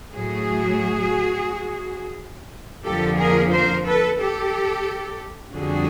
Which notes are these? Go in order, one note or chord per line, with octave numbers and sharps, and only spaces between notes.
A2 F#3 A3 F#4 G#4
F2 D3 F3 A#3 G4 A4
G#4 A#4
A#4 C5
A4 B4
G4 A4
F2 D3 G3 F#4 G#4